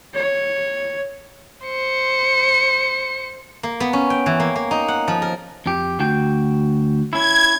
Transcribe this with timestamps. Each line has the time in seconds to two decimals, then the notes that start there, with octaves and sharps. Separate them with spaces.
0.14 C#5
1.65 C5 C#7
3.63 A#3
3.80 B3
3.93 C#4
4.10 G5
4.26 E3
4.40 A#3
4.56 A#3
4.71 D#4
4.88 F#5
5.08 F3
5.22 A#4
5.66 F2 G4
6.00 D2 F#4 G5
7.13 C#4 E4 G#6